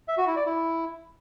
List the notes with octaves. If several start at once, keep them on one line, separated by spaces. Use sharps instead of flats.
E5
F#4
E4
D5
E4